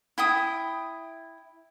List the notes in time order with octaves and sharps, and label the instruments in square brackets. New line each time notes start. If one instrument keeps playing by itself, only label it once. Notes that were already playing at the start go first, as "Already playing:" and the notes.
[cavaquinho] E4 G5 D#6